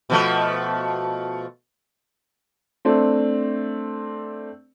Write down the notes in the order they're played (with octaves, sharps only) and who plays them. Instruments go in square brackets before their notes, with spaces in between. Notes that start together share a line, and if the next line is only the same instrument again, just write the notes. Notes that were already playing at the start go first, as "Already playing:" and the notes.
[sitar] B2 F3 A3
[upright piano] A3 C4 D4